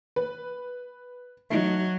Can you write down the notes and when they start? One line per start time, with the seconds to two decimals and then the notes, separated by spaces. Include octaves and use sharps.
0.16 B4
1.50 F#3 A3 D#4